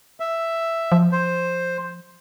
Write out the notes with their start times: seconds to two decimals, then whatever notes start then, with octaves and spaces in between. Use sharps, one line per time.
0.20 E5
0.92 F3
1.12 C5